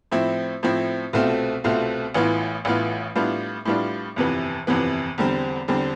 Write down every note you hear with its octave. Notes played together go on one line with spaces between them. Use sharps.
A2 F3 C4 E4
A2 F3 C4 E4
C2 B2 A3 C4 F4
C2 B2 A3 C4 F4
A1 A2 E3 B3 F4
A1 A2 E3 B3 F4
A2 G3 B3 D4 F4
A2 G3 B3 D4 F4
G1 F2 C3 E3 B3
G1 F2 C3 E3 B3
E2 D3 G3 C4
E2 D3 G3 C4